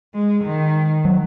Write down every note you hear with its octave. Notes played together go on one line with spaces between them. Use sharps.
G#3
D#3
F#3